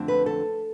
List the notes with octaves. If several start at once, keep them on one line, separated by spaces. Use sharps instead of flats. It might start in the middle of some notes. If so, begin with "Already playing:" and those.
Already playing: F2 D3 A3 C4
B4
A4